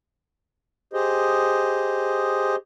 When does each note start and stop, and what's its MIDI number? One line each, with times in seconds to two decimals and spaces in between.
0.93 2.56 67
0.93 2.56 68
0.93 2.56 72
0.93 2.56 75